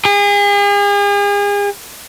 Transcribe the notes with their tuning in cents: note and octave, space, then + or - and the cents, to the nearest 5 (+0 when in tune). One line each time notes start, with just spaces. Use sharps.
G#4 -40